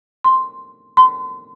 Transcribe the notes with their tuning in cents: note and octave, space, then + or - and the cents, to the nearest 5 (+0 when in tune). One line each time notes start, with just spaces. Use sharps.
C6 +0
C6 -35